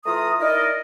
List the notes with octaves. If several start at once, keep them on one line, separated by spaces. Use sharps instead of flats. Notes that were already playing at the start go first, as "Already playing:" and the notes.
E3 A3 F4 A#5 D#6
D#4 E4 A#4 D5 D#5